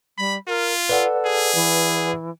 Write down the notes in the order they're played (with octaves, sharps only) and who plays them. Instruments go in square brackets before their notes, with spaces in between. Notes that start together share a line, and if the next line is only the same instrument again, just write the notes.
[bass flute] G3 [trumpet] B5
[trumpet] F4 [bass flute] A#4
[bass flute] A4 [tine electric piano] B4 D5 F#5
[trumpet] G#4
[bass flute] E3